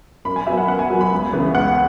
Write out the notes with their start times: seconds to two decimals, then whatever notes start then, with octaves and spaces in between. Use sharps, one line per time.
0.25 F#2 B5
0.36 G#5
0.47 F#3 B3 E5
0.57 F#5
0.68 F#2 F#5
0.79 G#5
0.90 F#3 B3
1.01 B5
1.11 C#2
1.33 C#3 E3 B3
1.55 C#2 F#5